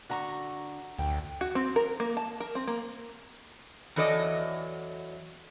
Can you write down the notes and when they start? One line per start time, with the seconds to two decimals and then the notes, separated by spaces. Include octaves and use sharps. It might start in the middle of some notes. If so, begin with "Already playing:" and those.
0.10 D3 F#4 A#5 C#6
0.98 D2 G5
1.41 F#4
1.55 C4
1.76 A#4
2.00 A#3
2.17 A5
2.40 A#4
2.55 C4
2.67 A#3
3.96 E2 E3 F#3 A4 D5 D#5